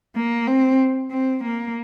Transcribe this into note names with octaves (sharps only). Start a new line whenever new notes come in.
A#3
C4
C4
A#3